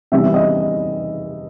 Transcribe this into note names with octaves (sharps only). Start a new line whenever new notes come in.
C3 E3 G3 B3 D#4 E5
D#5